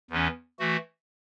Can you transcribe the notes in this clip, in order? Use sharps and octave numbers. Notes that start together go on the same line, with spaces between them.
E2 E3 C#4
E3 A3 F#4